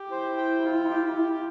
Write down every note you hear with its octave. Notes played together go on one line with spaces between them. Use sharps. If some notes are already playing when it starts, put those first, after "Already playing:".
Already playing: G4
E4 C5
G5
F4
G4